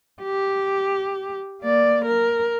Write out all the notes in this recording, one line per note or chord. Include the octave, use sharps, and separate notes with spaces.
G4
A#3 D5
A#4